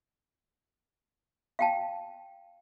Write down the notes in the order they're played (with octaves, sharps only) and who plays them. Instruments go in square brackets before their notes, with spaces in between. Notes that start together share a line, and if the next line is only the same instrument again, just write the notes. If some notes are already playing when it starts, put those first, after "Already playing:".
[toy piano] F5 G5 A5